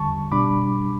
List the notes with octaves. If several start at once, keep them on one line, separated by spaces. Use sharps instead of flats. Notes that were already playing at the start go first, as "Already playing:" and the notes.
Already playing: E2 D3 G3 A5 C#6
B2 G3 D4 B5 D6